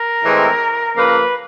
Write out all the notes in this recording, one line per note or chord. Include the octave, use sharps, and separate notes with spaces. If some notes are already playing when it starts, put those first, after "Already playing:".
Already playing: A#4
A2 E3 G#3 C4
C#3 F3 A#3 B4